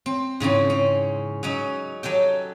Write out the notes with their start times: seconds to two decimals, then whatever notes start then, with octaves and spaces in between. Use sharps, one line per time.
0.06 C4
0.40 G#2 C#3 E3 C4
0.70 C#4
1.43 F#3 C#4 D#4
2.03 F#3 G4 A4 G5